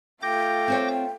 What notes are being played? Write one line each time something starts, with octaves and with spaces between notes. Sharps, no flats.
A3 F4 G5 D6 G6 A#6
C4 C5 C#5